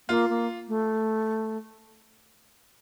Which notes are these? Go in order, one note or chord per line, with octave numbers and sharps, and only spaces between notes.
A#3 F4
A#3
A3